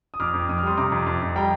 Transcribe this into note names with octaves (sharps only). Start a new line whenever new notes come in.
D#6
F2 D6 F6
F2
F2 D#6
F6
G3 C6 D#6
C3 A#5 D6
F2
F2
F2
G3 G5 A#5